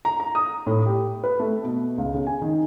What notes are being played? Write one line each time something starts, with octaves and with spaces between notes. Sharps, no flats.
A#5
A#5
D#6
A2
G4
B4
A3
B2
C#2
C#3
G#5
D#3